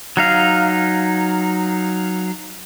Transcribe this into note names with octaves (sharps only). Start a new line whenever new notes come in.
F#3 D#4 F5